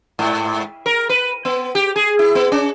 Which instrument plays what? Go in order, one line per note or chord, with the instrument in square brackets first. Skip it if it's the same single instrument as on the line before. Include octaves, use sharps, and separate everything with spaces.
[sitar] G#2
A#4
B4
B3
G4
G#4
E4
B3
C#4